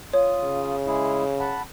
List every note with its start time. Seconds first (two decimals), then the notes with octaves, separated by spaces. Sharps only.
0.13 F4 C#5 D#6
0.44 C#3
0.86 G#3 E4 G#4
1.40 F#5 A5 B5